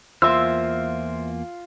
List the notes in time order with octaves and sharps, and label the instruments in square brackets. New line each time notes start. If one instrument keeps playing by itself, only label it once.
[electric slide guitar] E2 A#3 [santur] F4 C6 [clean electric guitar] C5 E5 [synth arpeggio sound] E6